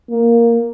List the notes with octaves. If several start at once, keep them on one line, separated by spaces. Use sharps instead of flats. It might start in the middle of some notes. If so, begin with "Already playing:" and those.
A#3